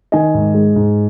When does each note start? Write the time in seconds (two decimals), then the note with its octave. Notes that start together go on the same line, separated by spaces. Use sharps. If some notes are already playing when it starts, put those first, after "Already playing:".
0.12 D#3 D#5 G#5
0.34 G#2
0.54 G#3
0.76 G#2